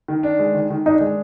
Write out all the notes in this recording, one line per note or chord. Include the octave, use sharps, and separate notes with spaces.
D#3
D4
G#3
D#3
D#3
D4 D#4
G#3